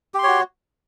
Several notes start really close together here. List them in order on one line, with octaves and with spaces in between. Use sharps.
G4 C6 C#5 F#4